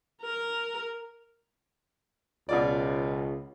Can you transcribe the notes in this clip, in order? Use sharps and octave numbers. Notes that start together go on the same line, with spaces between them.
A#4
C#2 B2 F4 D5